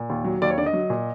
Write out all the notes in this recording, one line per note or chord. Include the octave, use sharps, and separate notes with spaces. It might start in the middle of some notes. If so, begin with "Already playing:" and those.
Already playing: A#2
D#2
F#3
D#2 D5
C#5
D3 D5
D#5
F#3
A#2